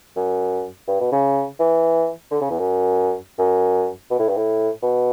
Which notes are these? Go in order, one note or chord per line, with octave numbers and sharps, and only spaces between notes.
F#2
G2
B2
C#3
E3
D3
C#3
E2
F#2
F#2
B2
A2
G2
A2
B2